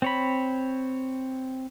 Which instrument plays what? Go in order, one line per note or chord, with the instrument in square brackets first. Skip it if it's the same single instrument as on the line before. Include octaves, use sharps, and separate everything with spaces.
[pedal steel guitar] C4 C#5 B5